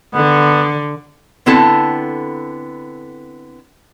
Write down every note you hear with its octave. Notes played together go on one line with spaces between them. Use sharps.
D3 B3
D3 B3 C4 E4 A4